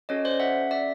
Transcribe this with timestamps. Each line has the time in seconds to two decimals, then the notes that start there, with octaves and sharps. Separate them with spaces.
0.09 C#4 F#4 A4 C#5 D#5
0.25 C5 D5
0.40 E5 F#5
0.71 D5 E5